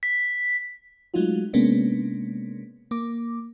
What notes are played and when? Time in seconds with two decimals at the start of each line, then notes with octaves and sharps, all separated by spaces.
0.03 B6
1.14 F#3 G#3 A3 D#4 F4 F#4
1.53 C3 G#3 A#3 B3 C#4 D4
2.91 A#3 D6